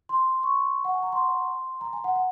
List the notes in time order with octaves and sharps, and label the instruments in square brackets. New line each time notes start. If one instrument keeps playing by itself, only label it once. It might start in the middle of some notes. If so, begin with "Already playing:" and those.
[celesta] C6
C#6
F#5
G#5
A#5
C6
A#5
G#5
F#5
F#5